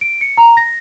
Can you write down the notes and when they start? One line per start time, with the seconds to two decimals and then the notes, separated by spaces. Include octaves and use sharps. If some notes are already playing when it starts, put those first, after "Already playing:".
0.01 D7
0.21 C#7
0.37 A#5
0.57 A#6